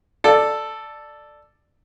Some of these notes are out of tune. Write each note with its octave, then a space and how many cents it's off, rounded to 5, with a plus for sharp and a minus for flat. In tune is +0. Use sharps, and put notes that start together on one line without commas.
A4 +0 D5 +15